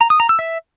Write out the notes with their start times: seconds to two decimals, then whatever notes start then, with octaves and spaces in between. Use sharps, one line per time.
0.01 A#5
0.10 D#6
0.20 A#5
0.29 E6
0.39 E5